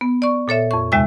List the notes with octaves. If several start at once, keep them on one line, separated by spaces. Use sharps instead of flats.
B3
D5 C#6
A#2 A4 C#5 E5
F2 C#6
D#2 C3 G#3 E5 G#5 E6